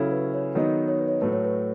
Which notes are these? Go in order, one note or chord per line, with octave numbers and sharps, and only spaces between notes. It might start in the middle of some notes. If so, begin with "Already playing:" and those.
Already playing: C#3 F#3 C#4 E4 A4
B4
C#5
D#3 F#3 B3 D#4 D#5
C#5
B4
C#5
A2 F#3 A3 B4
C#5
B4